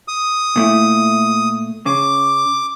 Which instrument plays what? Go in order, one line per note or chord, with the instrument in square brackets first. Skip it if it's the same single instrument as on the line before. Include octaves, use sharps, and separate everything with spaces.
[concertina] D#6
[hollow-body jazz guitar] A#2 A3 E4
[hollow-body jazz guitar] C#3 [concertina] D6